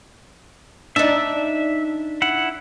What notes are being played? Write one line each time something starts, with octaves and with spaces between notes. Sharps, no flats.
D4 D#4 E5
E4 F#5